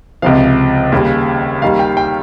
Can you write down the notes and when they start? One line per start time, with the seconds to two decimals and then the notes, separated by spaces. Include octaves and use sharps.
0.22 C#2 C3 F3 F5
0.92 D#2 C#3 G3
1.62 D#2 D#3 G3 F5
1.79 G5
1.97 G5